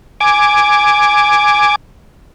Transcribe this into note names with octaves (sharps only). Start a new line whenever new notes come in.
G#5 D6